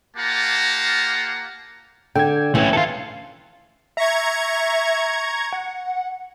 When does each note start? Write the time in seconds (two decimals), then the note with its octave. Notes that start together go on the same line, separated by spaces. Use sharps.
0.17 A#3 F4 G4 F#5 A5 A#5
2.16 D3 G5 G#6
2.55 E3 A3 C#4
2.73 F4 A4
3.97 E5 A#5 C#6 G#6
5.53 F#5